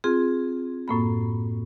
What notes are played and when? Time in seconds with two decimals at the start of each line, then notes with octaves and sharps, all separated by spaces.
0.04 C4 F4 G#4
0.88 F#2 A2 A#3 B5